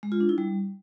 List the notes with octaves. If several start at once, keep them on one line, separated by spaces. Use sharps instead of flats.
G#3
F4
D4
E4
G3